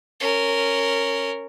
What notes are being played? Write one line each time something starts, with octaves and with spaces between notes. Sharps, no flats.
C#4 A#4